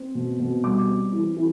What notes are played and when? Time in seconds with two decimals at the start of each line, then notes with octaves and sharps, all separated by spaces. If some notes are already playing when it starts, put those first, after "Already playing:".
Already playing: C4
0.15 B2
0.40 B2
0.64 G3 D6
0.88 C4
1.13 E3
1.37 E3